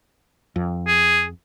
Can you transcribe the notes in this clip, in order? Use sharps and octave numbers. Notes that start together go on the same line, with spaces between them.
F2
G#4